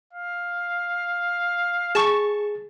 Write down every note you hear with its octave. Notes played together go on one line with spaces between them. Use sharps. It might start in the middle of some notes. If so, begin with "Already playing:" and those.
F5
G#4 A5 C#6 A6